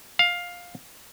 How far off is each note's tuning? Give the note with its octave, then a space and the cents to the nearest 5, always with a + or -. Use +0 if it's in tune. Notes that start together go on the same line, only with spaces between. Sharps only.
F5 +10